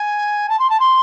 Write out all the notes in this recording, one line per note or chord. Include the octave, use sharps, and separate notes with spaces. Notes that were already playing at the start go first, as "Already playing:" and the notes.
Already playing: G#5
A5
C6
A5
C6